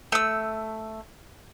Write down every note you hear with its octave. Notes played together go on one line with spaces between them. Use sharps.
A3 E6